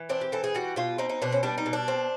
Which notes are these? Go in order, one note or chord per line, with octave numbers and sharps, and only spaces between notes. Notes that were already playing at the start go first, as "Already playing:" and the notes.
Already playing: E3
C4 D4
G4
E3 A4
G#4
G3 F#4
B2 F4
C4 D#4
D#4
B2 D4
C#4
G3 D4
D#4
B2
D4
C4